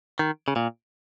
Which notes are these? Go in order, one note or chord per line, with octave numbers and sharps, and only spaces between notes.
D#3
C#3
A#2